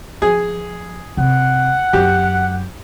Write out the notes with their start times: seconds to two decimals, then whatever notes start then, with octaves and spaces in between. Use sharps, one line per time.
0.22 F3 G#4
1.17 C3 F#5
1.93 F#2 G4